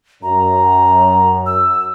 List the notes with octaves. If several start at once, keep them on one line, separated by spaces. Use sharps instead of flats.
F#2 A#5
E6